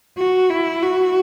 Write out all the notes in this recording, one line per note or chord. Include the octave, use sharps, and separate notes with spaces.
F#4
E4
F#4